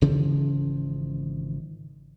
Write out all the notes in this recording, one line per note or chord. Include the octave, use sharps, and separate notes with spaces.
G#1 C#3 E3 F3